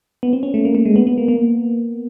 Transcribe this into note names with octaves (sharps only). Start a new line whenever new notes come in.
B3
C4
C#4
A3
A#3
A3
G#3
B3
B3
A#3
A#3